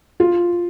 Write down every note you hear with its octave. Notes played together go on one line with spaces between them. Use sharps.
F4